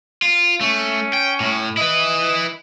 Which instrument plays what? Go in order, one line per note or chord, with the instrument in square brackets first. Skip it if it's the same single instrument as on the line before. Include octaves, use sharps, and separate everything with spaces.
[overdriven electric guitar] F4
[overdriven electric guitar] A3 [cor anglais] C#4
[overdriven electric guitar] G5
A2
[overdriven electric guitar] E4 B4 [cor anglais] D#5